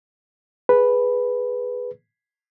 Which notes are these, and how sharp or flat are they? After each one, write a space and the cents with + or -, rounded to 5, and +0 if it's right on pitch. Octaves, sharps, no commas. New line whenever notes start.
G#4 +0 B4 +0